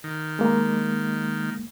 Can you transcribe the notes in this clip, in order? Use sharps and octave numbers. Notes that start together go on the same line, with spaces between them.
D#3
G#3 A#3